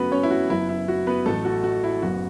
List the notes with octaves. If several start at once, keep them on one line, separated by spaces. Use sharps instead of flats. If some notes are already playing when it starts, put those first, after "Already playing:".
Already playing: F#2 C#3 A3 B3 F#4 B4
C#4 C#5
E4
F#4
F#1 F#2 F#3 B3 E4
E4
F#4
B3 B4
A1 A2 F#3 A3 A4
F#4
F#4
E4
F#1 F#2 F#3 B3 F#4